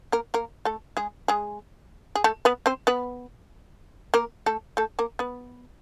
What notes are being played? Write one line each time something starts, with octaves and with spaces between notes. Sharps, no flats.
A#3 A#4
A#3 A#4
A3 A4
G#3 G#4
G#3 G#4
G#4
A3 A4
B3 B4
C4 C5
B3 B4
A#3 A#4
A3 A4
A3 A4
A#3 A#4
B3 B4